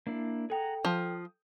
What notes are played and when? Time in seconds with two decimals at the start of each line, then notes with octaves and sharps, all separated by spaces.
0.07 A#3 D4 E4
0.50 G#4 A4 F#5 G5 A#5
0.85 F3 D#6